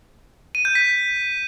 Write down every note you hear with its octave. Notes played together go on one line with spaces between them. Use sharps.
D#7
G6
B6